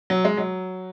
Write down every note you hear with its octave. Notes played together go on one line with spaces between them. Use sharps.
F#3
G#3
F#3